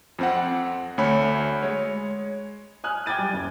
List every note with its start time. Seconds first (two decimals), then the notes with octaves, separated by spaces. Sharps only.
0.19 F2 C4 F#5
0.98 D2 A3 C#5 B5
1.62 G#3 C#5
2.84 G#5 D#6 F6 F#6
3.06 G5 D6 G#6 A6 D#7
3.18 G3
3.33 F#1